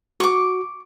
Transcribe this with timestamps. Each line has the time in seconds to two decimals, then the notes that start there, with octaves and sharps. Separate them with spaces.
0.20 F#4 C#6 D6